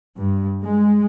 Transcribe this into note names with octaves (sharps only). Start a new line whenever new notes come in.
G2
G#3